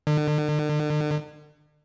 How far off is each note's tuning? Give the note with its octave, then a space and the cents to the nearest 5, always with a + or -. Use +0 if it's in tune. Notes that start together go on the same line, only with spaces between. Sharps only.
D3 +40